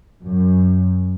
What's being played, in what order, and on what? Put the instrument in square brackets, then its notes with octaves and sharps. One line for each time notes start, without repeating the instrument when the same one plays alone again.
[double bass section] F#2